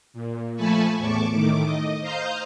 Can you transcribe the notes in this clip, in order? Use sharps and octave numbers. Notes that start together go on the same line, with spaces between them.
A#2
F3 A3 G#5 A5 B5 C#6
E2 A2 A5 C#6 D6
A2 D#3 A3 D6
D#5
C5 D#5 F5 A#5 G6